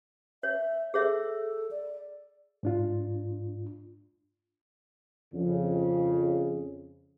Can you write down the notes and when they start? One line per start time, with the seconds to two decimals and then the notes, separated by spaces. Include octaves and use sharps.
0.43 C#5 E5
0.94 G#4 A4 C#5 E5
1.71 D5
2.63 G#2 D4 F4
5.33 F2 C#3